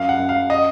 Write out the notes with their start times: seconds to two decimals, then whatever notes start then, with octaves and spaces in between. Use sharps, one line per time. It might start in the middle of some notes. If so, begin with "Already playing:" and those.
Already playing: F#2 F5
0.09 F#5
0.19 F#2
0.29 F5
0.50 D#5